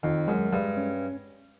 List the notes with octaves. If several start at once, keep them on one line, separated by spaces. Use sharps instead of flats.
F2 D#3
F#2 G#3
G2 G#3
C#4